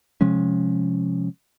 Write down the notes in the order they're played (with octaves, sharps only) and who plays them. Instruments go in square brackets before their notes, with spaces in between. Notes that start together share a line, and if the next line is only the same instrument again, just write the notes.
[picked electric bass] C3 F3 G#3 C#4